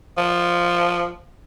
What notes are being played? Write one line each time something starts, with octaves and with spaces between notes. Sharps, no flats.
F3